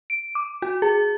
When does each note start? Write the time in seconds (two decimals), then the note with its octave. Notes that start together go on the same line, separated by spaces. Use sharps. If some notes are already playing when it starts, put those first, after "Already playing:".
0.10 D7
0.35 D6
0.62 F#4
0.82 G#4